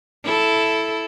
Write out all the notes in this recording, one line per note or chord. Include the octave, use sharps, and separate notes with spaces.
E4 A4